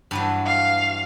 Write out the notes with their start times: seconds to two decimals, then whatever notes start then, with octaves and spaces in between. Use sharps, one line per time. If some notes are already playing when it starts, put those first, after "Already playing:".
0.11 G2 E3 F#3
0.45 F5